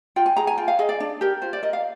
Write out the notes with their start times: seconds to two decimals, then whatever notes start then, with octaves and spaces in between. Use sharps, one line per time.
0.16 F4 G5
0.26 G#5
0.37 G#4 A#5
0.47 G#5
0.58 F4 G5
0.68 F5
0.79 G#4 D#5
0.89 D5
1.00 D4
1.21 G4 A#4
1.42 F4 C5
1.53 D5
1.63 A#4 D#5
1.73 F5